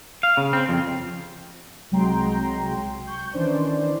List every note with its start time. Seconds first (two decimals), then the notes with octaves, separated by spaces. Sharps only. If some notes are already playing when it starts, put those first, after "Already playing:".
0.23 F5
0.37 C#3
0.53 C4
0.69 F2
1.91 C2 F#3 G#3 G5 A#5 C6
3.07 C#6 G6
3.33 D#3 E3 C#4 D4 C5 D5